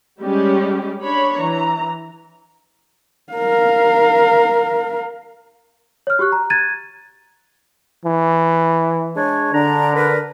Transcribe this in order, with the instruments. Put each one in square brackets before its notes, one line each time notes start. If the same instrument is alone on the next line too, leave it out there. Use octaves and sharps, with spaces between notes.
[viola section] G3 G#3 C#4 G4
D4 C#5 B5
E3 A#5
[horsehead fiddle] A#4 F5
[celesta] C#5 F6
F#4 G4 C#6 F#6
A#5
F#6 G#6 A6 D#7
[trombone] E3
[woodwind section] G#3 D4 C#5
[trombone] D3 [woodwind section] D4 A#5
[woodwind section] D4 A#4 B4